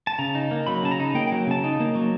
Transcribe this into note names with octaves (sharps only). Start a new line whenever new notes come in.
A5
C#3 A#5
D#4
A#3
F#3 B5
C#3 A5
A#5
D#4
A#3 G5
G5
F#3
C#3 A5
D#4
A#3
F#3